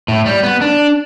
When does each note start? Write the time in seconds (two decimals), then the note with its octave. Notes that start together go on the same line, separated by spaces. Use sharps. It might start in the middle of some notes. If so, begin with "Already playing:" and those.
0.08 A2
0.26 G3
0.43 B3
0.61 D4